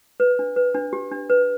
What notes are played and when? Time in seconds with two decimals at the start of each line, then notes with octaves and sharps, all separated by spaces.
0.20 B4
0.39 D4
0.56 B4
0.74 D4
0.93 G4
1.12 D4
1.30 B4